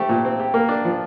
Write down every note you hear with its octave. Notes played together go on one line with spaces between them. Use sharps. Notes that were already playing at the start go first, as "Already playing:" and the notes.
Already playing: A3 C4 G4
A#2
C4
G4
A#3
D4
F3